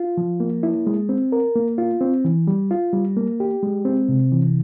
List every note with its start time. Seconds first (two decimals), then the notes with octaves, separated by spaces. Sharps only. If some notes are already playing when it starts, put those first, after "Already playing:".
Already playing: F4
0.17 F3
0.40 A#3
0.63 E4
0.87 G#3
1.09 C4
1.32 A#4
1.56 A#3
1.78 F4
2.01 C4
2.25 E3
2.47 G3
2.71 F4
2.93 G3
3.17 A#3
3.40 G4
3.63 G#3
3.85 C4
4.09 C3
4.32 E3